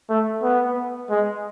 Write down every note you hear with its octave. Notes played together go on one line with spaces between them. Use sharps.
A3
B3
G#3